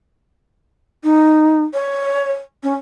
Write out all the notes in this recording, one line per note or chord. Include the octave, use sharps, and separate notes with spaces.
D#4
C#5
C#4